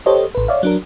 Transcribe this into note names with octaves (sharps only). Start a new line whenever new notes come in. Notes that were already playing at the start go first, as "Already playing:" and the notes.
G4 A4 C5 C#5 D#5
A1 B4
C#5 D5 E5 F5
F#3 D4 A#4